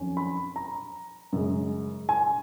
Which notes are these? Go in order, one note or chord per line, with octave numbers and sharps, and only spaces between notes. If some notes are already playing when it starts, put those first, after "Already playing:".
Already playing: F2 D#3 F#3 C#4
B5
A#5
F#2 C#3 G#3
G#5